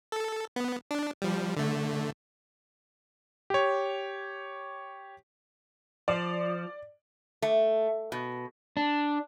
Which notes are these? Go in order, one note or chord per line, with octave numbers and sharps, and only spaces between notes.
A4
B3
D4
F3 G3
D3 A3
G4 C#5
F3 D5
A3
B2
D4